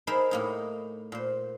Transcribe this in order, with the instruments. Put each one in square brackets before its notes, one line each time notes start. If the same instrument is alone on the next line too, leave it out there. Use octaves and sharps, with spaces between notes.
[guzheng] D#4 G#4 A#4 C5 E5 B5
A2 A#3 D#4
A#2 C5